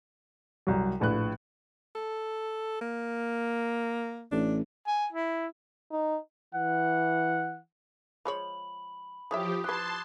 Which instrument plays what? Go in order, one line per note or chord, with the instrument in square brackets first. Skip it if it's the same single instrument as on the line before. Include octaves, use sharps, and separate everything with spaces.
[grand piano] C2 F#3
A#1 A2 B4 F#6
[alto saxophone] A4
A#3
[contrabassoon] A1 [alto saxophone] D4
[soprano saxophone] G#5
E4
[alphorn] D#4
[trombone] E3 [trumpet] F#5
[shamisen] F3 G#3 C#5 [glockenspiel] B5 F#7
[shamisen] E3 C#5 E5 [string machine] F3 G4 [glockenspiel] D6 D#6
[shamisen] E4 B4 [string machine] A5 C6 [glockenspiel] F#6 G#6